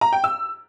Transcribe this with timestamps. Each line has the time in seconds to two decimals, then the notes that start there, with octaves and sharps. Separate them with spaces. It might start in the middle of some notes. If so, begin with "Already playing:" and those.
0.01 A#5
0.13 G5
0.24 E6